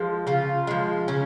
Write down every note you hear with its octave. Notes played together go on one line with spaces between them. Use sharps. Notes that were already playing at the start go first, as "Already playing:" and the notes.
Already playing: F3 G#3
C#3 F4
F3 G#3
C#3 C#4